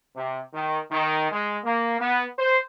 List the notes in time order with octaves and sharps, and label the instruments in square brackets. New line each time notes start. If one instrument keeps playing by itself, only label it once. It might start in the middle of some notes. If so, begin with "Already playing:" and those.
[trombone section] C3
D#3
D#3
G#3
A#3
B3
C5